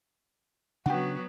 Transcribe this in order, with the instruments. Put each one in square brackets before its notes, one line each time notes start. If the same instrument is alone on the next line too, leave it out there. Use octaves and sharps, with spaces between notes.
[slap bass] C#3 D4 [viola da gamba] F#3 B3 F#4 [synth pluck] F#5 G5